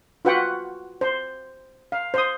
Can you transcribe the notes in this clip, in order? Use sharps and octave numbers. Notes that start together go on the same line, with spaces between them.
F4 F#4 B4 F#5 G5
C5
F5
C5 D#6